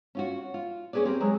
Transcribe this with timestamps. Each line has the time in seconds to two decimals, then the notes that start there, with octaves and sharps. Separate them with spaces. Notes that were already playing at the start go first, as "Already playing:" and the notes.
0.15 C#4 F4 F#4
0.54 F4
0.93 C#4 D4 G#4 B4 D5
1.05 C4 G4 A#4
1.20 F#3 G#3